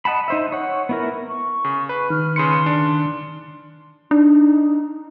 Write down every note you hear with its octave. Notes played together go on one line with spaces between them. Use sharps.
D#5 F#5 A5 B5
D#4 C5 E5
C#5 F#5
B3 E4 A#4
C#6
C#3
B4
D#3 F6
C#3 B4 C6 C#7
D4
D4 D#4